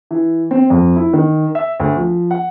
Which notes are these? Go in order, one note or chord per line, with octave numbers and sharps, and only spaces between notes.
E3
C4
F2
E4
D#3
E5
D2
F3
F#5